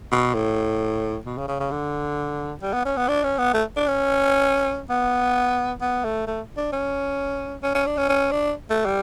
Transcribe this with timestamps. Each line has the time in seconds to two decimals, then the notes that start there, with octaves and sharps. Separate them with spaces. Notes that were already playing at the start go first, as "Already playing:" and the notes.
0.12 B2
0.34 A2
1.25 B2
1.38 C#3
1.48 C#3
1.60 C#3
1.71 D3
2.62 G3
2.73 B3
2.85 C#4
2.97 B3
3.08 D4
3.24 C#4
3.38 B3
3.54 A3
3.76 D4
3.88 C#4
4.90 B3
5.81 B3
6.04 A3
6.27 A3
6.57 D4
6.72 C#4
7.63 C#4
7.75 C#4
7.87 D4
7.97 C#4
8.09 C#4
8.32 D4
8.70 A3
8.85 G3